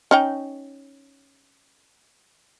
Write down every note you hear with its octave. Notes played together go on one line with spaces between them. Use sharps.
C#4 D#4 G5